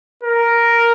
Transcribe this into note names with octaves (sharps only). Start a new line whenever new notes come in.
A#4